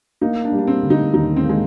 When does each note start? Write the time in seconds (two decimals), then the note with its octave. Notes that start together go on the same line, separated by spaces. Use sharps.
0.21 A#3 D#4
0.44 D4
0.52 G3
0.58 D4
0.67 C4
0.82 D3
0.90 D#4
1.14 D#2 D#4
1.36 C4
1.44 A#3
1.49 G#3